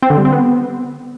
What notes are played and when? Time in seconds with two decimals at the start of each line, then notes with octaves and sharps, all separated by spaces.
0.02 C4
0.10 D3
0.17 G3
0.25 C4
0.32 B3